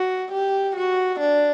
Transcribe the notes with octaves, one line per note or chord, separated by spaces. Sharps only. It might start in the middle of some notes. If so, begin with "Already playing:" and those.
Already playing: F#4
G4
F#4
D4